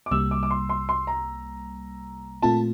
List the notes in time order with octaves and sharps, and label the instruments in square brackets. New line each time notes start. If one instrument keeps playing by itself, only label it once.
[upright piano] D6
[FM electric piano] C2 C3 G3 A#3 [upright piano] E6
[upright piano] D6
D6
C6
C6
C6
A#5
[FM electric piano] A#2 A3 C4 F4 [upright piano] A5